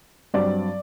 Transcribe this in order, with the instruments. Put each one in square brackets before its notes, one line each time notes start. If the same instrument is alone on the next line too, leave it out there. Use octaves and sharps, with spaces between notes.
[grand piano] G2 F#3 C4 D5